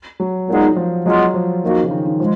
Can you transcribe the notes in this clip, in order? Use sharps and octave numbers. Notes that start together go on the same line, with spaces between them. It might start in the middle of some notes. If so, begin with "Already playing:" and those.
F#3
A#2 G#3 B3 D#4 G#4
F3
F#3 G#3 B3 F4
F3
D#3 A#3 D#4 F#4
C#3
D#3
D#3
F3 G#3